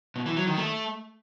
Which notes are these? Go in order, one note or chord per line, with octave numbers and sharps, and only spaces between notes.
B2
E3
F#3
D#3
A3